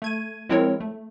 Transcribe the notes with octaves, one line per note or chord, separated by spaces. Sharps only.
A3 G#6 D#7
F3 G#3 C4 E4 A#4 C#5
A3